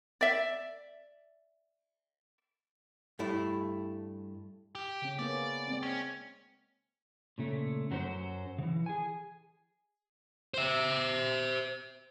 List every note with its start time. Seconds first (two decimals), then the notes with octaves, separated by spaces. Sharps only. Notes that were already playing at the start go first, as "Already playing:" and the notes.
0.21 D5 E5
3.19 G2 A3 E4
4.75 G4
5.02 C#3 C#4
5.19 A#3 B3 C#4 D5
5.68 G#3 C4
5.83 C#4
7.38 A#2 C#3 A3
7.91 F#2 F#3 C#4 D4 C5
8.58 C#3 E3
8.86 G#4 G#5
10.54 C5 E5